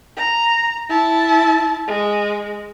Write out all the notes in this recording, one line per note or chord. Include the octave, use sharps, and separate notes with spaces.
A#5
E4 A5
G#3